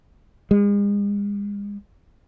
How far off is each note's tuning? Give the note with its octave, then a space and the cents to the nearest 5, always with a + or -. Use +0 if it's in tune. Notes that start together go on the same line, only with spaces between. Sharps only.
G#3 -40